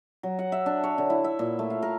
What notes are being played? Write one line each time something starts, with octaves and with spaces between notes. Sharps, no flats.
F#3
F#5
E5
D4
C#5
D3
E4
E5
A#2
A3
F5
A#4